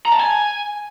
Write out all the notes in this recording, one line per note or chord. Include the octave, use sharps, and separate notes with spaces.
A#5
A5
G#5